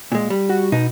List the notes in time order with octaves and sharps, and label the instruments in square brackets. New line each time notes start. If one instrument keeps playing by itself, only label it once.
[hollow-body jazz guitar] A#2 G#3
G3
[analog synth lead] F#4
[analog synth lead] B2 [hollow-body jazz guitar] D#4